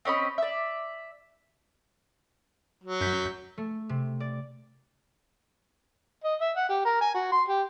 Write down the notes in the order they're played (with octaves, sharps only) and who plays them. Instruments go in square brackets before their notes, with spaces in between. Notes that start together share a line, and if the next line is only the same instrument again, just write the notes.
[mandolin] C4 C#4 D#5 B5
D5 E5
[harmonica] F#3
[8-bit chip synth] F#2 G6 B6
[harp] A3
C3
D5
[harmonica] D#5
E5
F#5
G4
A#4
G#5
F#4
C6
G4